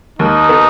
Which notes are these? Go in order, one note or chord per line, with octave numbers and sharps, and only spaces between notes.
D#2 D#4
B3